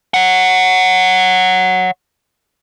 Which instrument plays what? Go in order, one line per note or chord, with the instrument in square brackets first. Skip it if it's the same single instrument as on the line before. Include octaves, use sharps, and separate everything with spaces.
[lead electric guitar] C#5 F#5